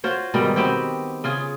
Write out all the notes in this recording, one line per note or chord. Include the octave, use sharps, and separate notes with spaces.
F4 F#4 C5 C#5
G#2 B2 D#3 G3
B3 C4 F#4 G4
C#3 F4 G#4